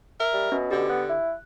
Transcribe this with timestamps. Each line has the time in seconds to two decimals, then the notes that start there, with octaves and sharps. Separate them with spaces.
0.20 A#4 E5
0.33 G3
0.52 B2 C#4
0.71 D3 G4
0.90 B3 F#6
1.09 E4